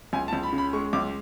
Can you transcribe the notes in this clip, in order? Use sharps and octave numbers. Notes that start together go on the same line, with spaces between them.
C#2 G#5
A5
C#2
B5
C#3
B5
G#3 C#6
C#2 D6